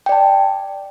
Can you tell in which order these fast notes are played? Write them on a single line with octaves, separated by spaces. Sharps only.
G5 D5 A5